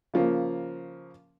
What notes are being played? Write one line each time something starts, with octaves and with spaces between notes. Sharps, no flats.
C#3 F3 A#3